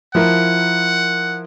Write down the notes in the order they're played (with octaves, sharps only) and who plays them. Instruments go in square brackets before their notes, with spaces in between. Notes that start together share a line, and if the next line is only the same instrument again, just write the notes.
[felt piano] F3 E4 A#4 [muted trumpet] F#5